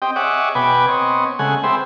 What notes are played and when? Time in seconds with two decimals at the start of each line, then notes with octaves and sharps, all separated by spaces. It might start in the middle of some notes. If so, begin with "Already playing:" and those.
0.02 C4 G4 D#5 G5
0.16 G#4 C#5 D#5 E5 F#5 D6
0.55 B2 B3 B4 G5 G#5 D6
0.88 B3 C4 C#5 D#5
1.39 C#3 G#3 A3 F#5 G#5
1.64 C4 G4 G#4 B4 C5 E5